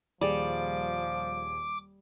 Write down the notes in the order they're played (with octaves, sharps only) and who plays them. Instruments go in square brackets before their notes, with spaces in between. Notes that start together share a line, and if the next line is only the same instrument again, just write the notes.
[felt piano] D#1 G#4 [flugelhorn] F3 [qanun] G3 [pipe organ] D6